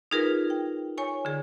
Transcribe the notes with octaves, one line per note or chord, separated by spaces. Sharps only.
D#4 F4 G#4 A#4 B4
G5
C#5 G#5 C#6
D3 G#4